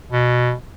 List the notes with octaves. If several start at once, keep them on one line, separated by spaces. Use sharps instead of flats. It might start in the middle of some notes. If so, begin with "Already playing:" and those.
B2